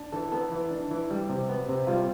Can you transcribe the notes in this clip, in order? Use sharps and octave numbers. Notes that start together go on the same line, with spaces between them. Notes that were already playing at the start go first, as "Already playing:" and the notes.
Already playing: D4
E3 A4
B3 A4
E3
D4
E3
G3
C3
B3
C3
G3 F4